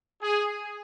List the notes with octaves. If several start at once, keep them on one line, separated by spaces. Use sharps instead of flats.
G#4